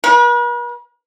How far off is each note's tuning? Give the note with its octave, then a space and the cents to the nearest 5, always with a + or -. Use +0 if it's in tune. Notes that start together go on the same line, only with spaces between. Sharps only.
B4 -45